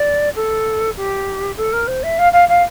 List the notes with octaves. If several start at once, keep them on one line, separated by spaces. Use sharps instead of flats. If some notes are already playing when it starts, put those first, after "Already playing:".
Already playing: D5
A4
G4
A4
A#4
C5
E5
F5
F5
F5